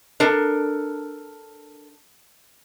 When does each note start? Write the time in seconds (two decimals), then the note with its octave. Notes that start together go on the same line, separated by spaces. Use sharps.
0.20 D4 A4 A#4